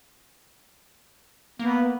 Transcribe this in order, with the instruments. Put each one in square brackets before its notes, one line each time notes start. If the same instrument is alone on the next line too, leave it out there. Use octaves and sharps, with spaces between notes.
[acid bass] A#3 [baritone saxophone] B3